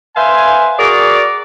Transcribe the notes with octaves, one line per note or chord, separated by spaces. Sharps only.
B4 C5 E5 F5 G#5
F#4 G#4 A#4 D5